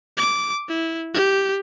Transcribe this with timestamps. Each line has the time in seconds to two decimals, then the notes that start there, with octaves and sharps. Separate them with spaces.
0.17 D6
0.69 E4
1.14 G4